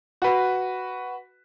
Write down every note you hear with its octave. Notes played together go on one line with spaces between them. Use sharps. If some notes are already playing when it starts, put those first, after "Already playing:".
F#4 B4